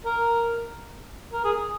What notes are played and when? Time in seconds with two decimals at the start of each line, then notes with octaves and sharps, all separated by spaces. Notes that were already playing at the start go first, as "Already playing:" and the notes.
0.05 A#4
1.33 A#4
1.45 G#4